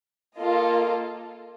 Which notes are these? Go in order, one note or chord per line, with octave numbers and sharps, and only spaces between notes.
A#3 F4 A4 D#5